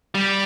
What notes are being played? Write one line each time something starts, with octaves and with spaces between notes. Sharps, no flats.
G3